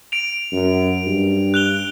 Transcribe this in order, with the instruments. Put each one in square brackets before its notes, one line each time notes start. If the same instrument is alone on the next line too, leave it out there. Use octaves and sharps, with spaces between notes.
[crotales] D7 F7
[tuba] F#2
G2
[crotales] F#6 F7 G7